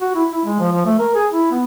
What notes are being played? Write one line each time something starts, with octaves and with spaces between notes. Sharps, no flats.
F#4
E4
E4
G#3
F3
F3
A3
A#4
G#4
E4
B3